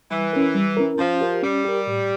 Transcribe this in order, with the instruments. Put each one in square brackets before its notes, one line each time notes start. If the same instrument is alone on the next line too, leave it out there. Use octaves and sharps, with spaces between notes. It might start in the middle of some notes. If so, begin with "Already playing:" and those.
[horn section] E3 [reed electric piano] G3
[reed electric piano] C#4 E4 A#4
G3
C#4 E4 A#4
[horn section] F3 [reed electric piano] C#4
[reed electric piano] G4 A#4
[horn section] G3 [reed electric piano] C#4
[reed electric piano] G4 A#4
A2